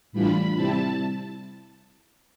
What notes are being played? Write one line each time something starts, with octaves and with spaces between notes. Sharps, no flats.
A2 E3 G3 D4 F4 B5
C3 G3 C4 E4 A5